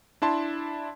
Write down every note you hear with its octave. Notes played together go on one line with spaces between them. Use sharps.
D4 E4 A5 C6